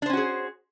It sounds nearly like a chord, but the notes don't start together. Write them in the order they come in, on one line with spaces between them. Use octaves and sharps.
D4 C5 C#4 F#4 G#4